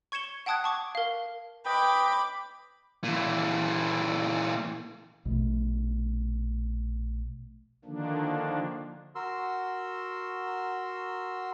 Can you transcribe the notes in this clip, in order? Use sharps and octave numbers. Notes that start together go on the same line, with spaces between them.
C#6 G#6 C#7 E7 G7
F#5 G5 A5 D#6 F#6 G#6
A5 C#6 D6
A#4 F5
B4 D#5 G5 B5 D6
A#2 E3
A#1 B2 A3
D3 D#3 F3 A#3 D4
F#4 A#4 C6 E6